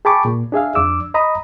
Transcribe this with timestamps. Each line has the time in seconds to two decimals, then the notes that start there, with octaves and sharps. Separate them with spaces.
0.05 G#4 G5 A5 B5 C#6 D6
0.25 A#2
0.52 D4 G#4 E5 F5
0.75 F2 D4 D6 E6
1.14 D#5 A#5 B5 D#6